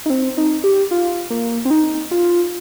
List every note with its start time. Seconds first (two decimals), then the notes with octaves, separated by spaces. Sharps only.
0.06 D#4
0.10 C4
0.37 D#4
0.64 G4
0.91 F4
1.30 A#3
1.65 C4
1.71 D#4
2.11 F4